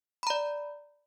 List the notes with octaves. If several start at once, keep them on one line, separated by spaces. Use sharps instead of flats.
D5 A#5 B5